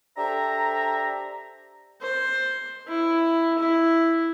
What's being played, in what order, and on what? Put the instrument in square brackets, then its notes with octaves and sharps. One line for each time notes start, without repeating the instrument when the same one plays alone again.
[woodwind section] D4 G4 A4 C5 E5 A#5
[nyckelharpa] C5
E4
E4